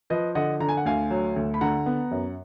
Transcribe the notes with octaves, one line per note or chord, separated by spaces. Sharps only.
F3 B4 D#5
D3 D#5 F#5
D3 A#5
G#5
F#5
D2 F5 G#5
F#3
D2
B5
D3 F#5 A#5
B3
F#2